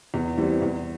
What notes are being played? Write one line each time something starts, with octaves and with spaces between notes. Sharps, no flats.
E2
E3 G3 C4 E4
E2